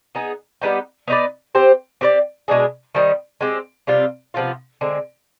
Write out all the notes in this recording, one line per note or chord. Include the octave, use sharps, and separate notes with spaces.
B3 D#4 G#4
G3 B3 D#4 G4
B3 D#4 B4 D5
C4 G4 C5
C4 G4 B4 D5
B2 G#3 D4 G#4
D#3 G3 C4 D#4
G#3 C4 G4
C3 G3 C4 F4
C3 F3 B3 F4
D3 G#3 C4